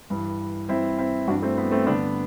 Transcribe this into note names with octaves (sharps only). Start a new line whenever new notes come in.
G2 E3
G2 E3 C4 E4
C4 E4
G2 E3 D4 F#4
A3 C4
B3
A3 C4
G2 D3 B3 D4